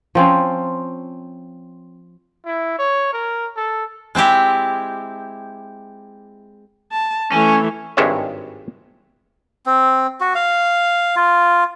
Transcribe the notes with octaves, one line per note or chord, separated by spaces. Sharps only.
F3 C4 C#4
E4
C#5
A#4
A4
G#3 C4 E4 G4
A5
E3 A3 C#4
G#1 G2 G#3 C#5 E5
C4
F#4
F5
F4